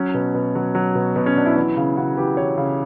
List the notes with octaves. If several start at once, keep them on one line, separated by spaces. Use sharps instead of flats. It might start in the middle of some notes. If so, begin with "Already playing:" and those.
Already playing: F#3 C#4
B2
B2
F#3
F#3
B2
B2
C#4
F#3 D4
E4
E3 E4
C#3
C#3 F#4
E3 G4
E3 C#5
C#3